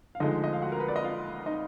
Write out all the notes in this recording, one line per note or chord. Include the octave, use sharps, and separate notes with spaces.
F5
D2 D3 F3 G#3 D#4 D#5
D#5
F5
F#4 F#5
A#4
B4
D5
D#5
F4 F5
D#4 D#5